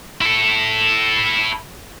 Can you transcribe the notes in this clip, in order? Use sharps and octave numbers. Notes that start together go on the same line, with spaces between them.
E4 A4